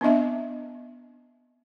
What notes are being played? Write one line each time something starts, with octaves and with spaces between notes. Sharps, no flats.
B3 C4 D4 D#5 E5